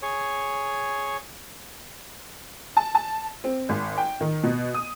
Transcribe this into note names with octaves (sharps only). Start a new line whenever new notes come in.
G#4 C#5
A5
A5
C4
G#1
G5
D#3
B2
D#6